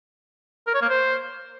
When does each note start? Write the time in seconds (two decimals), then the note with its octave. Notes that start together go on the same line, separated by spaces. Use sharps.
0.67 A#4
0.74 C#5
0.82 A#3
0.89 C5